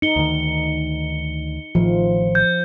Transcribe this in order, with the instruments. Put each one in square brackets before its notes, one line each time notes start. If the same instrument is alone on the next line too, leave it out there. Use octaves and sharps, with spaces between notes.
[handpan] D#4 [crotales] C#7 G7
[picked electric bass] D2 D#3
[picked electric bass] A1 A2 D#3 [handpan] F3
[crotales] G6